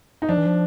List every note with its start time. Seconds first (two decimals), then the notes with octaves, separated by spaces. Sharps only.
0.22 D#4
0.29 F3 D4
0.37 E3
0.46 F3